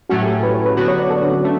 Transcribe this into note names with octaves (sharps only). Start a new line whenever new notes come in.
A2 F#3 A3 C#4 F#4
G4
A4
B4
C#5
B4
D3 F#3 B3 F#4
C#5
D5
A4
D4
C#4
A3